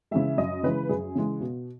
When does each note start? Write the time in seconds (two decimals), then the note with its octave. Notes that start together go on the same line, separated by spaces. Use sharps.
0.11 C#3 E3 G#3 E5
0.38 F#2 D#5
0.63 C#3 E3 G#3 B4
0.89 F#2 G#4
1.15 C#3 E3 G#3
1.40 B2